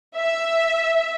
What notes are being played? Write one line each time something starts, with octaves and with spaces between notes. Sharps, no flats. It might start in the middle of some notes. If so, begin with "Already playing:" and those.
E5